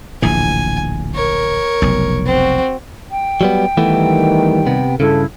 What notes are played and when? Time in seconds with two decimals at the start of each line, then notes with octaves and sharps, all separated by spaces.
0.22 D1 A#1 E3 G#5
1.15 A#4 C#5
1.82 F1 B1
2.26 C4 F#4
3.11 G5
3.41 F#3 G3 B3
3.77 D#3 E3 G3 A3 B3
4.66 C3 B3
5.00 G2 C#3 E4 A4